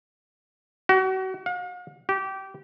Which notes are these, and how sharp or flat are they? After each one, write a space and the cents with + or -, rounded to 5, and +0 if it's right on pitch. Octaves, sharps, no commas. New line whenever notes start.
F#4 +35
F5 +45
G4 -25